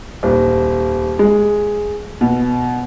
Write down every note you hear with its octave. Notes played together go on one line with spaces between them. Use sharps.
D#1
G#3
B2